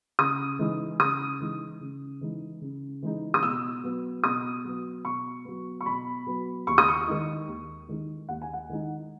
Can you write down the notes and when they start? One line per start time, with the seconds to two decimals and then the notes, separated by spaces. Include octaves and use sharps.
0.19 C#3 D#6
0.59 E3 G#3 D#4
1.00 C#3 D#6
1.40 E3 G#3 D#4
1.81 C#3
2.21 E3 G#3 D#4
2.61 C#3
3.02 E3 G#3 D#4
3.34 D#6
3.43 B2 E6
3.83 F#3 B3
4.24 B2 D#6
4.65 F#3 B3
5.05 B2 C#6
5.45 F#3 B3
5.81 C#6
5.86 B2 B5
6.27 F#3 B3
6.67 D#2 C#6
6.78 D#6
6.88 C#6
7.07 D#3 G#3 D#4
7.48 D#2
7.89 D#3 G#3 D#4
8.29 D#2 F#5
8.42 G#5
8.54 F#5
8.69 D#3 G#3 D#4